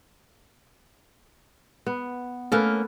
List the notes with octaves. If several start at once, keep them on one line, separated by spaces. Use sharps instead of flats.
B3
A3 A#3 C#4 A4 B4